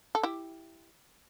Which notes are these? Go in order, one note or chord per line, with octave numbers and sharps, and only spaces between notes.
A4
E4 G4